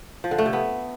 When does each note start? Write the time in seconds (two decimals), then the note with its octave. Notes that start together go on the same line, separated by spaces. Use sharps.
0.24 F3
0.31 D3
0.38 A3
0.46 C3
0.53 B3